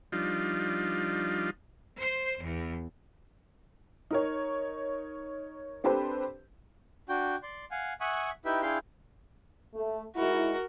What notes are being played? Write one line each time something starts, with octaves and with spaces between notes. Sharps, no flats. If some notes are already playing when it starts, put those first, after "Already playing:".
F3 G3 D4 D#4 F4
C5
E2
D#4 A#4 C#5
C4 D4 G4 A4 B4 C5
D4 F#4 G5
D5 C6
F5 F#5 G#5
E5 F#5 G#5 C#6 D#6 F#6
D#4 E4 G4 B4 E5 G5
D4 E4 G#4 F5 G5 C6
A3
G#3 D#4 E4 F#4 A#4